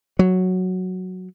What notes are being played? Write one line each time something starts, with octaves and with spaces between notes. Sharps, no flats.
F#3